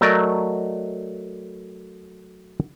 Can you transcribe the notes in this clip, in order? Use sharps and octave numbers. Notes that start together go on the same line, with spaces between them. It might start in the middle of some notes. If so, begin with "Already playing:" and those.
F#3 A3 A#4 D5 D#5 A#5